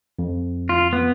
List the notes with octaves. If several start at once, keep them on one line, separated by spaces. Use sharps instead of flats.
F2
F4
B3